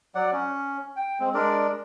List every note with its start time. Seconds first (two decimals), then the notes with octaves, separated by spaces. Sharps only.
0.15 F#3 D5 F#5
0.33 C#4
0.96 G5
1.20 G#3 C4
1.34 G#3 D4 A#4 D5